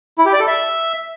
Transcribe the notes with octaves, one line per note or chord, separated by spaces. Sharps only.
E4
G4
D5
A4
E5